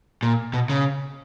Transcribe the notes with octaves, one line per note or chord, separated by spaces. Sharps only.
A#2
B2
C#3